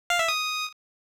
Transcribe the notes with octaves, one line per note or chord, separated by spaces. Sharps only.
F5
E5
D#6